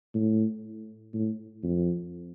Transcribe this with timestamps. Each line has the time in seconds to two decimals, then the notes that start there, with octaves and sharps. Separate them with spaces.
0.14 A2
1.13 A2
1.63 F2